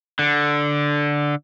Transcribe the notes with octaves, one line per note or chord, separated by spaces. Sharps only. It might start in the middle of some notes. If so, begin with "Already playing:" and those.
D3